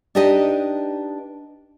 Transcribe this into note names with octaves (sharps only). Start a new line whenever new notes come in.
D4 D#4 G4 B4 D#5